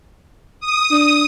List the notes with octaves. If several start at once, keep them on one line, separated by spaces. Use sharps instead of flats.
D#6
D4